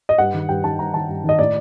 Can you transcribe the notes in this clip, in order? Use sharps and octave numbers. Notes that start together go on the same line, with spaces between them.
D#5
G2 F#5
D#3
G2 G5
D#3 A5
G2 A#5
D#3 A5
G2
D#3 D#5
A2 D5